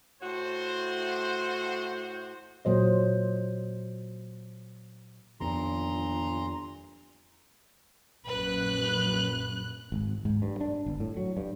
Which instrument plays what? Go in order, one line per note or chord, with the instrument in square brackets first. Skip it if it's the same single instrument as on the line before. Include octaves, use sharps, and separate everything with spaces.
[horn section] A2 F#4 C5
[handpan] A#2 F#3 C5 D#5
[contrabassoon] G1 [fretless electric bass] F2 D#3 [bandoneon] A#2 A#5 C6
[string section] A#1 F#2 F#6 [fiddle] B4
[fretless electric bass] G#1
G#2
G2
D4
G1
A2
F#3
G2